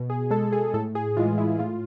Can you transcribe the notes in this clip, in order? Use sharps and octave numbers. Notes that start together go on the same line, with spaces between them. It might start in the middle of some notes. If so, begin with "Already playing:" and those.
Already playing: B2
G#4
G#3 A4
G#4
A2 A4
G#4
E3 G#3 F4
E4
A2 F4